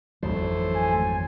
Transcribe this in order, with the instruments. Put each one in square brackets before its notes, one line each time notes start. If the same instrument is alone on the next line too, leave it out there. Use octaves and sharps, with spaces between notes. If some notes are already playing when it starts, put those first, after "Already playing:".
[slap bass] G#1 F2 F#3 [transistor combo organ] E3 A3 C5
[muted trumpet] G#5